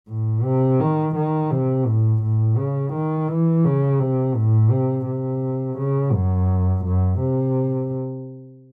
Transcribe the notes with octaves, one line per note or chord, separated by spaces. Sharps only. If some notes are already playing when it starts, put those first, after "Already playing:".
A2
C3
D#3
D#3
C3
A2
A2
C#3
D#3
E3
C#3
C3
A2
C3
C3
C#3
F#2
F#2
C3